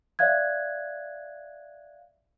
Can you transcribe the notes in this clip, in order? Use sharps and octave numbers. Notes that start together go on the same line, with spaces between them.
C#5 D5 E5 F5 F#6 G#6